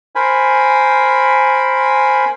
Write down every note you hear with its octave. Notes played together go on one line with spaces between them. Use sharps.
A#4 C5 G#5 B5